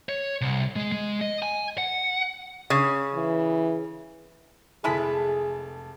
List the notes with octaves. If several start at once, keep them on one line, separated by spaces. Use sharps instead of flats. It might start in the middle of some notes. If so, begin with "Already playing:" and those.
C#5
C2
G#3
G#3
D#5
G#5
F#5
C#3
E3
F1 G#3 E4 G#4 A4 A5 B5